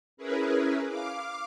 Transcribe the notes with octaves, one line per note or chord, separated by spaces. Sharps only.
C#4 E4 G#4 A#4 B4
F5 D6